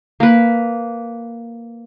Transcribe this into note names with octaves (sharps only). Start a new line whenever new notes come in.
A#3 B4